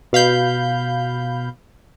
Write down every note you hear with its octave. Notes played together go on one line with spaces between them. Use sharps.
B2 F5 B5 G6